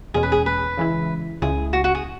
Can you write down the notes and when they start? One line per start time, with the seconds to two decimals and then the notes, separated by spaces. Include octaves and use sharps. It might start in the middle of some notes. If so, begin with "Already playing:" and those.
0.14 E2 B2 G#3 C#4 G#4
0.23 B4
0.32 G#4
0.46 B4
0.77 C#3 E3 G#3 E4
1.42 C#2 C#3 G#3 E4 G#4
1.73 F#4
1.84 F#4
1.95 G#4